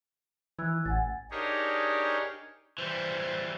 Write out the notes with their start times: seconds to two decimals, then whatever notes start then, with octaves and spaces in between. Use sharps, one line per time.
0.58 E3 E6 F#6 G#6
0.85 A1 F#5 G#5 A6
1.31 D4 D#4 G4 G#4 A#4 C#5
2.78 E3 G3 C5